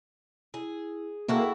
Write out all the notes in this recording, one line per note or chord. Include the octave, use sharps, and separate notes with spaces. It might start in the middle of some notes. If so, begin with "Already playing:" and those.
E4 G#4
A#3 E4 F#4 G#4 A4 G5